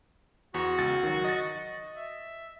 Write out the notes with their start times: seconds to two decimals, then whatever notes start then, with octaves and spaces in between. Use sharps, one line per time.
0.54 E2 F#4
0.79 C#2 A6
1.03 D#3 F#3
1.24 D#5 A6
1.95 E5